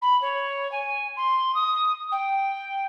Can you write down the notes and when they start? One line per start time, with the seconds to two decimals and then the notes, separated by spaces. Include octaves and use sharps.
0.01 B5
0.21 C#5
0.71 G#5
1.16 C6
1.54 D#6
2.11 G5